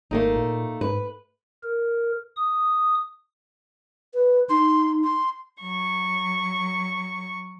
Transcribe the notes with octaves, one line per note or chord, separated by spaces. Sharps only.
G#1 A3 A#3 D#4
A#2
G#2 B4
A#4
D#6
B4
D#4 C6
C6
F#3 C#6